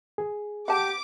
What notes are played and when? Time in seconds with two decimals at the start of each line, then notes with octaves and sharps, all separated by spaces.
0.18 G#4
0.68 G4 F#5 A5 D6